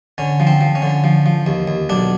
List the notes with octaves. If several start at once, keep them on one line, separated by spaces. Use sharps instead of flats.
D3 C#4
F3
C4
F3
C#4
D3
F3
F3
D#2
D#2
B1 D4